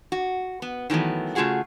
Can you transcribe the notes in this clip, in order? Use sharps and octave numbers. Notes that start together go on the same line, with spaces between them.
F#4
B3
D#3 E3 F#3 A3 B3
C#3 A3 F4 F#4 G#4 F#5